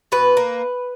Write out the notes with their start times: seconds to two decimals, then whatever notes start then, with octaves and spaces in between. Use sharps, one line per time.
0.12 B2 B4
0.37 A#3